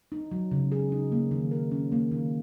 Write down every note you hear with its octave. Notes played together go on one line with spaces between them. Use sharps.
D#4
F#3
C#3
G#4
D#4
A#3
D#3
A#4
C#4
A#3
D#3